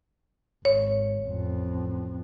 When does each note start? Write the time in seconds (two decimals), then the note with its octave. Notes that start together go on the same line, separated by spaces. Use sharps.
0.65 G#1 C#5
1.25 A1 F2